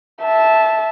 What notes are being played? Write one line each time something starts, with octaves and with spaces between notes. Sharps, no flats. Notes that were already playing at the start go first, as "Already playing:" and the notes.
E5 A5